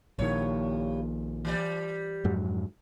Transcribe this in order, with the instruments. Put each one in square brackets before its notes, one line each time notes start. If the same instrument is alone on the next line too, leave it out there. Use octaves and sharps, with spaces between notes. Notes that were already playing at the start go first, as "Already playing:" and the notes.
[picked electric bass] A#1 A#2 D#3 [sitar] G2 C#5
[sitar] E3 G3 D5
[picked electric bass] F2 G#2 F#3